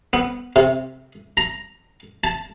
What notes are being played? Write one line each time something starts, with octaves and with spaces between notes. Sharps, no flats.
B3
C3
A#5
A5